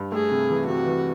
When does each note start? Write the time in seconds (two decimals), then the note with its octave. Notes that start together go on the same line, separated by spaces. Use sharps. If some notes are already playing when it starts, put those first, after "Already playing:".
Already playing: G2
0.12 A3 G#4
0.31 C3
0.50 E3
0.67 C3 F#4
0.86 E3